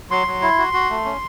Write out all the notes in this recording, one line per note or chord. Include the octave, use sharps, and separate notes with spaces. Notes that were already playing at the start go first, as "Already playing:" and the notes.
F#3 C6
F#3
E4
F#4
F#4
A3
C#4